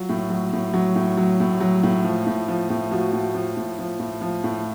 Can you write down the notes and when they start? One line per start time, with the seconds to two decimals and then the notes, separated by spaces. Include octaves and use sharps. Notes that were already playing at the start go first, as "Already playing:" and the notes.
Already playing: F#3 F4
0.09 A2
0.30 F#3
0.53 A2
0.74 F#3
0.96 A2
1.17 F#3
1.40 A2
1.60 F#3
1.83 A2
2.04 F3
2.27 A2
2.49 F3
2.70 A2
2.91 F3 F#4
3.13 A2
3.34 F3
3.57 A2
3.79 F3
3.99 A2
4.21 F3
4.44 A2